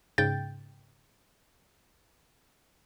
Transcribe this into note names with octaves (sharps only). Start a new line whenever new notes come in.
G#2 C#3 G5 G6 A6